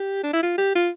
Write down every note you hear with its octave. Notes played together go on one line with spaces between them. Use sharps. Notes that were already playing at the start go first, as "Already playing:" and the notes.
Already playing: G4
D4
E4
F4
G4
F4